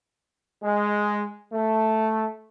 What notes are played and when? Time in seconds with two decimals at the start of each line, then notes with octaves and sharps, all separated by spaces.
0.63 G#3
1.52 A3